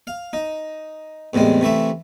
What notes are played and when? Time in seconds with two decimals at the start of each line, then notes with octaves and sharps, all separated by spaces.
0.07 F5
0.33 D#4
1.33 E2 A2 C3 G3 G#3
1.61 C3 E3 A3 E5